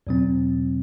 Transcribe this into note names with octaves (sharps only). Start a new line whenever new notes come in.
E2 B2 F#3 C4